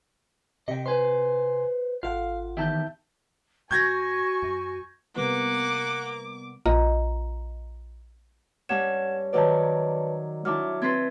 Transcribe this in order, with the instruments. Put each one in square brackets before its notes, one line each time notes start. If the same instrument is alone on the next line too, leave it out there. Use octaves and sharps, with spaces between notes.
[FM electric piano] C3 G4 [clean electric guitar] D#5 G5
[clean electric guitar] B4 C5 [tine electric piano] G#5 C6
[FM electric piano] G#1 A4 F#5 [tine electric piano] F4 [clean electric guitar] F5
[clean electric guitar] E2 D#3 G4 [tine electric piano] E5 A5 G6
[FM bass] G2 [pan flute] F#4 [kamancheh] G#5 C#6 [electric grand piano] G6 G#6 A#6
[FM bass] F#2
[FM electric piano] C3 G3 B3 [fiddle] A#3 [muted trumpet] F#5 [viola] D6
[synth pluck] A#1 F4 D#5 A#5
[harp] G2 C#4 C#5 [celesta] F#5 G#6 E7
[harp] D#3 F#3 D5 [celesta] B4 C#5 A5
[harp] F#3 E4 A5 [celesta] D4 D6 F6
[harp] C4 B4 C5 [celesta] G#6 A6